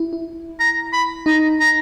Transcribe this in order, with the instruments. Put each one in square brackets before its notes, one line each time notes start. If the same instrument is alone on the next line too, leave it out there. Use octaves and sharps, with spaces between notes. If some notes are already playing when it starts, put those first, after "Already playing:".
Already playing: [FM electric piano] E4
E4
[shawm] A#5
B5
[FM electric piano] D#4 [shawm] A#5
[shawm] A#5